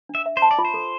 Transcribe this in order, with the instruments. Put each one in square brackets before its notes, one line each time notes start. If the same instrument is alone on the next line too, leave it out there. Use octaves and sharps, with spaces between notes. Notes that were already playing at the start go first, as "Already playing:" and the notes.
[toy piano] D4
[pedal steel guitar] E5
[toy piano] E5
[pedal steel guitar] C5
[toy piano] A5
[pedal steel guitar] D5
[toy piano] F4
[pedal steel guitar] C5
[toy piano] A4